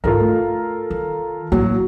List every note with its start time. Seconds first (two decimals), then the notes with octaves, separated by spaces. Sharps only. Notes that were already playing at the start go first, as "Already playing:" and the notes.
0.04 G#2 D3 F4 A4 A#4
0.20 A3
0.90 D#3
1.52 A1 F#3 A#3